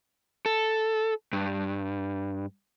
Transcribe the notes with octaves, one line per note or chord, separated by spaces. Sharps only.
A4
G2